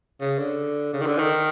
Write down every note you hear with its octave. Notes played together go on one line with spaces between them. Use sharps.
C#3
D3
C#3
D#3
D3
D#3